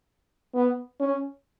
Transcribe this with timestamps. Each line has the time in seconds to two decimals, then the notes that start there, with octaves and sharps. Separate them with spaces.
0.54 B3
1.00 C#4